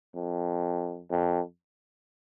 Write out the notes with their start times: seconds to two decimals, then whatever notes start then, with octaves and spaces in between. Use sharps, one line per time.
0.15 F2
1.11 F2